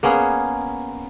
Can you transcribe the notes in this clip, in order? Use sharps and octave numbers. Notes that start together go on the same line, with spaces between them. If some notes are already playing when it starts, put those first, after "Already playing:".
A#3 B3 C#4 G#4